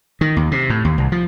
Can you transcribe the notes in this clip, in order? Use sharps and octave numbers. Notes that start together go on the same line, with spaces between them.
D#3
D#2
C3
A2
D#2
C2
F3